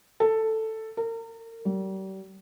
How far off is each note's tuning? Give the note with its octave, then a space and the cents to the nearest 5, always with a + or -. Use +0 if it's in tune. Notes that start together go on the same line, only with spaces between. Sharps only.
A4 +5
A#4 -35
G3 -40